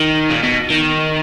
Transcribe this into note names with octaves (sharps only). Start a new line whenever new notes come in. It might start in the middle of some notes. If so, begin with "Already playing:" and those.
Already playing: D#3
A#2
B2
D#3